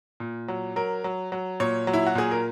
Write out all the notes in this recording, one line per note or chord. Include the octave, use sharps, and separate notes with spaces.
A#2
F#3
F#3 A#4
F#3
F#3
A#2 C#5
F#3
E4
F#4
A#2 G#4
A#4